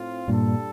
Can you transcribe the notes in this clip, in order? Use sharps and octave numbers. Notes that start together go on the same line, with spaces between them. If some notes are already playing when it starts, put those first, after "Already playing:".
Already playing: A2 C4 F4
G2 A#2 G3 D4 A4